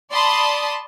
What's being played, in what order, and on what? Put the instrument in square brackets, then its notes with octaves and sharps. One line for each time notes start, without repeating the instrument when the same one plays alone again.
[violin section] D5 A5 B5 C6 D#6